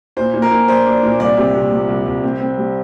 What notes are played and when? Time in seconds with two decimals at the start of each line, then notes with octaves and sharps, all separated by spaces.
0.17 A#2 C5
0.34 A#2
0.42 A#4
0.51 A#2
0.68 D4 C5
0.86 D4
1.03 A#2
1.20 C2 D5
1.37 C3
1.55 C3
1.72 F3
1.89 C2
2.06 C2
2.23 C4
2.41 C4
2.58 G3